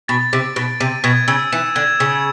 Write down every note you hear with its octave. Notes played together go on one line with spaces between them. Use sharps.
B2 A6
C3 D7
B2 A6
C3 D#7
B2 G#6
C#3 E6
E3 E7
D3 G#6
C#3 E6